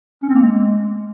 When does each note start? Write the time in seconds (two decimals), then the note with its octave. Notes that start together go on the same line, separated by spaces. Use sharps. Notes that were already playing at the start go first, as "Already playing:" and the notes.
0.23 C#4
0.29 C4
0.35 A#3
0.41 G#3